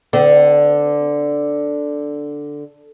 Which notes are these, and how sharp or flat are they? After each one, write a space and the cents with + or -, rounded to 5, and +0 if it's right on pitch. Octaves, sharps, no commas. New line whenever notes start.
D3 +0 B3 +45